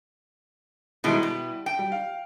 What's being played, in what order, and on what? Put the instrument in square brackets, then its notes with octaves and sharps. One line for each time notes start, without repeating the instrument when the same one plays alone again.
[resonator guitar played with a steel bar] B2 D#3 G#3 [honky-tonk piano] G3 E4
[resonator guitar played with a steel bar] B2
G5
[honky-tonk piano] G3
F5